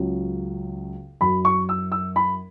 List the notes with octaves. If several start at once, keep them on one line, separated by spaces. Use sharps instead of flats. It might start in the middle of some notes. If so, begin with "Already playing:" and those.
Already playing: C#2 C#3 F#3
F#2 F#3 B5
C#6
E6
E6
B5